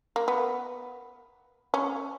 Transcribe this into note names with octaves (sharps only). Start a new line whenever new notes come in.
A#3
B3
C#4